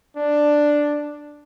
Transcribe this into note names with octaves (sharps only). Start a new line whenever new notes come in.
D4